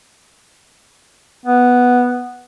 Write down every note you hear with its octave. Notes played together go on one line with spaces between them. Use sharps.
B3